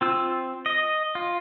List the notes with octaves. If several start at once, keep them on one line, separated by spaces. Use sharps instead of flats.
C4 F4 E6
D#5
F4